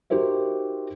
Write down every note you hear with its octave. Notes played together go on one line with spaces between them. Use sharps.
D#4 F#4 G4 A#4 C5 E5